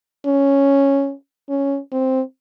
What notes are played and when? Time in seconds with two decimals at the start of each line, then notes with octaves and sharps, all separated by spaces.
0.26 C#4
1.49 C#4
1.92 C4